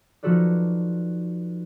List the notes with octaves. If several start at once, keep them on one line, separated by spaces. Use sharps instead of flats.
F3 D#4 F#4 A4 B4 D5